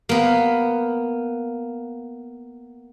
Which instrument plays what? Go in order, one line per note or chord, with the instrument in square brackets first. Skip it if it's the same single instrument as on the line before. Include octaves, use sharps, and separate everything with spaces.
[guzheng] A#3 B3